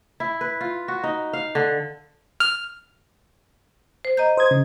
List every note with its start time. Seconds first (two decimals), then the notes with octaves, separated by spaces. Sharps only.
0.20 E4
0.41 B4
0.61 F4
0.88 F#4
1.04 D#4
1.33 F5
1.55 D3
2.40 F6
4.05 C5
4.17 D#5 A#5 G6
4.37 C5 D#6 G#6
4.51 C#3